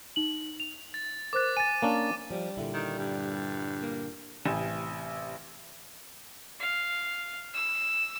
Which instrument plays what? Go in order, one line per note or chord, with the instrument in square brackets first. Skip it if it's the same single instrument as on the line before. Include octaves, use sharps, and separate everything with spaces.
[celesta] D#4 F#7
F7
[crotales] A6
[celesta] A#4 C5 F#6 [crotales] D6 A6
[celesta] G#5 A6 [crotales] D#7
[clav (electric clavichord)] A#3 C#4 D4
[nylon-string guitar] F3 [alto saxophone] G3
[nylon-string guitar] A#2 D3 E4
[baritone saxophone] D#3
G2
[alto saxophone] A#3
[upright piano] A1 C3 G4 G#5 E7
[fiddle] F5
E6